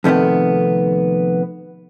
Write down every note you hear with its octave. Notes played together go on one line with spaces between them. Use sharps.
F2 C3 D#3 A3 B3